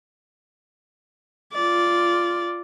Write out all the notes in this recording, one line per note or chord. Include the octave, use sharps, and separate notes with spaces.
F4 D5